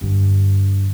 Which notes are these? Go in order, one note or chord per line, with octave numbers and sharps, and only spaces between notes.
G2 D3